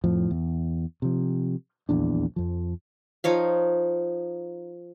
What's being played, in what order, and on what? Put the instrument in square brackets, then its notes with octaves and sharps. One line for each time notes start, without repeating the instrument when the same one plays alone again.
[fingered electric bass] F2 A2 F3
E2
C3 F3
D#1 A#1 E2 D4
F2 F3
[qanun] F3 D#4 C#5 F5